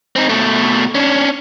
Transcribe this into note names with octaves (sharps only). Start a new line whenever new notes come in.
C4 D#4
B2 A3
C#4 D4